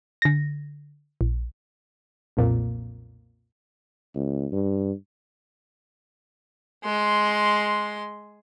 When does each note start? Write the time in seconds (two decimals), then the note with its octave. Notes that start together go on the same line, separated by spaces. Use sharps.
0.22 D3 A#6
1.21 A#1
2.37 B1 F2 A#2
4.15 C#2
4.52 G2
6.85 G#3 C6